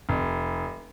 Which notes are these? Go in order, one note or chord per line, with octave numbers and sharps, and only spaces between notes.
F1